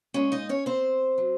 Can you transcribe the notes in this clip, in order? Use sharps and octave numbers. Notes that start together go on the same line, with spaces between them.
A#2 G#3 C#4 C#5
D#4 D#5
C#4 C#5
C4 C5
F#3